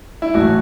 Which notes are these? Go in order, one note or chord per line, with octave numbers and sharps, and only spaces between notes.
E4
A1 A2 F#3 A3 F#4